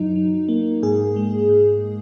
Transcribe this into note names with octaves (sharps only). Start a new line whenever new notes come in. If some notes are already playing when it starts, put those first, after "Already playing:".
Already playing: F#2 F#3 D#4
F#3
A#3
G#2 G#4
G#3
G#2